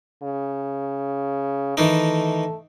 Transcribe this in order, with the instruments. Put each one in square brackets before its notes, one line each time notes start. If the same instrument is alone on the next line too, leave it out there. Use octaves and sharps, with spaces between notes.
[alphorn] C#3
[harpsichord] D#3 E3 D#4 [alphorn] A3